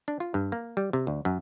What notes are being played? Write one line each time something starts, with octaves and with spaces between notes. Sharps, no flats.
D4
F4
G2
A#3
G3
C3
D2
F#2